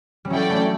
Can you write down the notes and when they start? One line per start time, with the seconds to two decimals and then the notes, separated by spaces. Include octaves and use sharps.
0.25 G3
0.30 F#3 C#4 E4 A4 D5 G5
0.50 A3